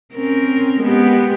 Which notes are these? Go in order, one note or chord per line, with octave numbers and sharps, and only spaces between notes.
C4 C#4 A#4
G#3 B3 G4